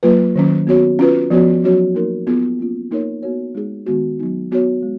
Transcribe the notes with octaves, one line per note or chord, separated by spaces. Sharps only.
F#3 A#3 F4 B4
D#3 F#3 C#4
B3 F#4 C#5
C#4 F4 B4
F3 B3 F#4 C#5
F#3 C#4 F#4 C#5
A#3 D#4 A#4
B3 F4 G#4
A#3 C#4 F4
A#3 D#4 A#4 C#5
B3 F#4 C#5
G#3 D#4 G#4
D#3 G#3 B3 F#4
F#3 B3 D#4
B3 F#4 C#5
G#3